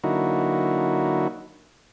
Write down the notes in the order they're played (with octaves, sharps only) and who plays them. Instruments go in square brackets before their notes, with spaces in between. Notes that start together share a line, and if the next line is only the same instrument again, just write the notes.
[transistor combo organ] D3 F#3 A#3 D#4 E4 F#4